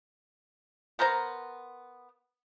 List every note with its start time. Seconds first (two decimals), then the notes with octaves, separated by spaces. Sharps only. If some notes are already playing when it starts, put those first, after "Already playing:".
0.99 B3 A#4 C5 A#5